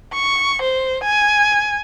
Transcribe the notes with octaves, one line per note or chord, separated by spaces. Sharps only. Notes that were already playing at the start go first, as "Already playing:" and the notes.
C#6
C5
G#5